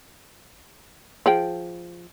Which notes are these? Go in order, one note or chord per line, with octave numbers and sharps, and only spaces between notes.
F3 G#4 G5